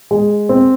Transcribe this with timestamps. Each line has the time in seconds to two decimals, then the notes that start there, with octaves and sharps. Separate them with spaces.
0.11 G#3
0.49 C4